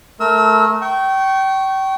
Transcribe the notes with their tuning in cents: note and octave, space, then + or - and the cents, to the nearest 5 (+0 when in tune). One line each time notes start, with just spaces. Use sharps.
A3 -15 A#4 -5 E6 -30
G5 -30 C#6 -5